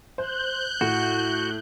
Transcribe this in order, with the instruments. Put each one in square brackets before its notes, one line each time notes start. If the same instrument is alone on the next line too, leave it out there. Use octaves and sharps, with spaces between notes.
[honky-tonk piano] C5 [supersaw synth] F#6 G6
[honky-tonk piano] A2 [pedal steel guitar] F#4